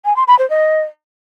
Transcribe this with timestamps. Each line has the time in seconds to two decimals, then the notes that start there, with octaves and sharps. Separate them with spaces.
0.05 G#5
0.16 C6
0.27 B5
0.39 C5
0.50 D#5